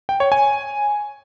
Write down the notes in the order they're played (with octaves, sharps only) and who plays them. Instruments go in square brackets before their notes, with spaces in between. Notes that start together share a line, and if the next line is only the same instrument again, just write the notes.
[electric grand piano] G5
C#5
G#5